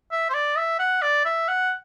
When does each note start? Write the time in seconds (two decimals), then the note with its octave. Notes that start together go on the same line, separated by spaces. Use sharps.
0.11 E5
0.30 C5
0.34 D5
0.57 E5
0.79 F#5
1.02 D5
1.25 E5
1.48 F#5